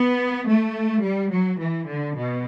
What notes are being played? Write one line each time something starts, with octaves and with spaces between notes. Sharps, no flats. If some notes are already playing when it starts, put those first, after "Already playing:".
Already playing: B3
A3
G3
F#3
E3
D3
B2